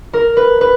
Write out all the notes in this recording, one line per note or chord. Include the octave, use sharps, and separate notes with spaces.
A#4
B4
B4